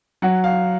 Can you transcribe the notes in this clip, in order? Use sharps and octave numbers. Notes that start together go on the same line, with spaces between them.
F#3 F#5
F5